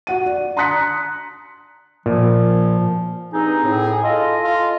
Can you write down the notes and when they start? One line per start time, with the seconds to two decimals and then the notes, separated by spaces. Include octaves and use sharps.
0.07 F#4 F#5 D#7
0.26 D5
0.57 A#5 C6 D#6 F#6 B6 C#7
2.06 A#2 F3
3.33 G2 C4 D#4 G#4
3.64 A2
4.03 F4 A4 D#5
4.44 F4